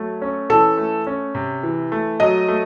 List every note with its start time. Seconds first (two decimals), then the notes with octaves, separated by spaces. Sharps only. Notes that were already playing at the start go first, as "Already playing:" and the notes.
Already playing: F#3 A3
0.22 C#4
0.49 E3 A4
0.77 A3
1.07 C#4
1.35 C3
1.63 E3
1.92 A3
2.20 F#3 D#5
2.48 A3